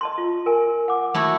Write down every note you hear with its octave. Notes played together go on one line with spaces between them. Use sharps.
D#5 A5 C6
F4
A#4 G#5
F#5 D6
A3 E4 F#4